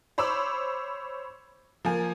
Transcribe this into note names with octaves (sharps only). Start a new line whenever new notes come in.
C5 C#5 B5 D6 E6
F3 A#3 G#5